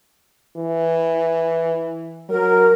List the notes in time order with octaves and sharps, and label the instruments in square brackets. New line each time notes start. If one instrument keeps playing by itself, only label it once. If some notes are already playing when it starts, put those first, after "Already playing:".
[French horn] E3
[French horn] F#3 [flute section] A#4